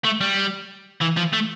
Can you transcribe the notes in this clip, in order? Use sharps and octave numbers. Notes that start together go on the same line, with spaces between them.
A3
G3
E3
F3
A3